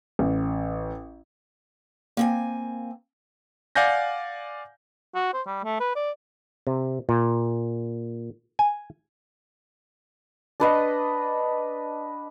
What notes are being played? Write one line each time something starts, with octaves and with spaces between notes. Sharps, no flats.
A1
A#3 C4 G#5
D5 F5 F#5 G#5 G6 A#6
F#4
C5
G3
A3
B4
D5
C3
A#2
G#5
D4 B4 D#5 F#5